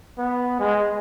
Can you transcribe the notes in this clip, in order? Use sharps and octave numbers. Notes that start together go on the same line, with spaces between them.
B3
G#3